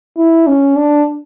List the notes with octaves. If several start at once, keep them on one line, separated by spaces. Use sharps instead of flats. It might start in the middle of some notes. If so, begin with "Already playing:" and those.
E4
C#4
D4